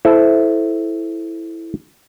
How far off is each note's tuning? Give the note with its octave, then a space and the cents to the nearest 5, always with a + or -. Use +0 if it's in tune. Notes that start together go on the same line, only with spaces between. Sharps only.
E4 +0 A4 -15 C5 -10